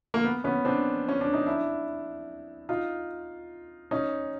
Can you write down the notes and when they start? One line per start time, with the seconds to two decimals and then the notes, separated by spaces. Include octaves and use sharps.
0.14 A#3
0.24 B3
0.44 B3 C#4
0.65 C4 D4
1.09 C#4
1.21 D4
1.34 D#4
1.46 D4 E4
2.69 D#4 F4
3.91 C#4 D#4